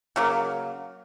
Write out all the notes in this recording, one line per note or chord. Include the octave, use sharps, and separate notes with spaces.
C#3 F#3 A#3